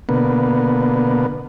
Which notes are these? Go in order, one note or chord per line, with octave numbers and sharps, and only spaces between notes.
B2 D3 A#3 B3